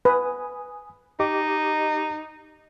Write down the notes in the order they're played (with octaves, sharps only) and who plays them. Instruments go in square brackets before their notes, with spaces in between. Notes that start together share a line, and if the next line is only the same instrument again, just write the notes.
[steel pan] B4 [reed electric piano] G#5 D#6
[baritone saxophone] D#4 [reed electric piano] G4 D#5 D6